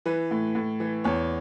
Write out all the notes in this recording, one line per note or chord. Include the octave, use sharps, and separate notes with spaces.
E3 B4
A2
A2
E3
E2 C#5